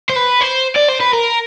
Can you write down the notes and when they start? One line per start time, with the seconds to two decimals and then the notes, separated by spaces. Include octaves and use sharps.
0.09 C5
0.16 B4
0.41 C5
0.76 D5
0.89 C5
1.00 B4
1.13 A#4